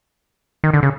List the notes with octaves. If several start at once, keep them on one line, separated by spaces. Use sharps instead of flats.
D#3
D3
C#3